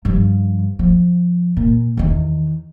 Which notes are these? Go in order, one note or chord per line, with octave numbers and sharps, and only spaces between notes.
G2 F3
F3
A#2
E2 D#3